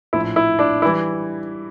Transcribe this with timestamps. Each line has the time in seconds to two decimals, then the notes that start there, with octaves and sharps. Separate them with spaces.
0.13 A#1 A2 F3 E4
0.36 E4
0.59 D4
0.82 E4
0.85 E3 G3